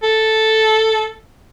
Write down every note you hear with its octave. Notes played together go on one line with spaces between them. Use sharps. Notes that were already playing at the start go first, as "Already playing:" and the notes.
A4